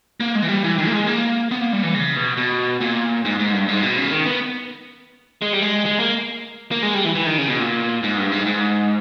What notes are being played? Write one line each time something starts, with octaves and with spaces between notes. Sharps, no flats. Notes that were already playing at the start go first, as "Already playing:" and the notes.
A#3
G#3
E3
G3
E3
D#3
A#3
G#3
A#3
B3
A#3
G3
E3
C#3
B2
B2
A#2
G#2
G#2
G2
G#2
B2
C#3
D#3
B3
G#3
G3
G#3
G#3
A#3
A#3
G#3
G3
E3
E3
D#3
C#3
B2
A#2
G#2
G2
G#2
G#2